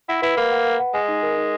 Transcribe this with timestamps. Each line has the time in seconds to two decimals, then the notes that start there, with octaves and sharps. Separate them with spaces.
0.09 E4 F#5
0.22 E4 B4
0.37 A#3 B5
0.51 F#5
0.66 F#5
0.80 F#5
0.94 G#3 G#5
1.08 D#4
1.23 A#4
1.37 D#4